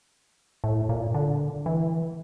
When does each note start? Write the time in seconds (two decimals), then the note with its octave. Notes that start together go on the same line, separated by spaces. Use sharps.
0.64 A2
0.89 A#2
1.14 D3
1.66 E3